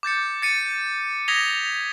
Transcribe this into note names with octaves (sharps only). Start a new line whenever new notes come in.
D6 G6 A6 C#7
A6 C#7 D#7
D#6 G#6 A#6 B6 F7 G7